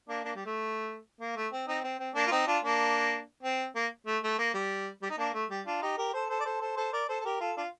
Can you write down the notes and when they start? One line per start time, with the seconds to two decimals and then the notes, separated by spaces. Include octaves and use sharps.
0.09 A#3 D4
0.24 A#3 D4
0.35 G3
0.46 A3
1.21 A#3
1.36 A3
1.53 C4
1.68 C4 D#4
1.84 C4
1.99 C4
2.15 A#3 D4
2.27 F4
2.31 C4 D#4
2.47 D4 F4
2.64 A#3 D4
3.43 C4
3.75 A#3
4.07 A3
4.23 A3
4.38 A#3
4.54 G3
5.02 G3
5.10 D#4
5.18 A#3 D4
5.34 A3
5.50 G3
5.66 D4 F4
5.82 D#4 G4
5.98 G4 A#4
6.13 A4 C5
6.29 A4 C5
6.40 D5
6.45 A4 C5
6.61 A4 C5
6.77 A4 C5
6.93 A#4 D5
7.09 A4 C5
7.21 A4
7.25 G4 A#4
7.40 F4 A4
7.57 D4 F4